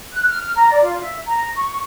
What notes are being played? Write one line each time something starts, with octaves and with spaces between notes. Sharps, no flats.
F#6
F6
A#5
D5
F4
E5
A#5
C#6